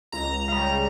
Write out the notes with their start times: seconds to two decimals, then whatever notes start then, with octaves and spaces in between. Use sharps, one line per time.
0.12 C#2 A#5
0.48 C#3 G3